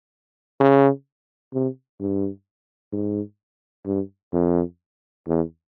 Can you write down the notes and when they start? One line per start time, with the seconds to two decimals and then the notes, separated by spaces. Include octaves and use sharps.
0.60 C#3
1.54 C3
2.00 G2
2.93 G#2
3.86 G2
4.33 F2
5.27 E2